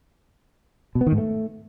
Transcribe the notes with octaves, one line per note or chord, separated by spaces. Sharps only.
B2
B3
D#3
G#2
A3